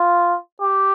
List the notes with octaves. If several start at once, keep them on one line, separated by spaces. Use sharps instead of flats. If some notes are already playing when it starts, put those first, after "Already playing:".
Already playing: F4
G4